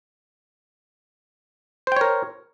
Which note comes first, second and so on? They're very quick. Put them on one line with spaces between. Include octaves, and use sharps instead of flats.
C5 G5 C#5 A#4